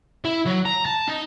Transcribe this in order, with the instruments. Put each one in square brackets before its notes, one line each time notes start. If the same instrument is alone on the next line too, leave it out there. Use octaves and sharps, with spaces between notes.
[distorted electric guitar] E4
F#3
A#5
A5
D#4